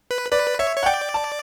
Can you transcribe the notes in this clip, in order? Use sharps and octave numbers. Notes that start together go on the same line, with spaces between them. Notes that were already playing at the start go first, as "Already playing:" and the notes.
B4
B4 D5
C#5 E5
C#5
F#5
D5 G5
A5